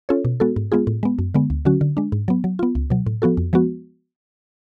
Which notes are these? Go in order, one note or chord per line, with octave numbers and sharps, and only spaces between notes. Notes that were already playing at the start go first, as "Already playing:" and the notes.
C#4 F4 A4 C#5
B2
G#3 B3 F#4 A4
G#2
G#3 B3 F4 G#4
A2
G#3 B3
F#2
D3 G#3 B3
D2
D3 F#3 C#4 F#4
D3
G#3 D4
G#2
F#3 B3
F#3
B3 F4
C#2
B2 F#3
A2
F3 B3 F#4 A4
F2
F3 G#3 B3 F#4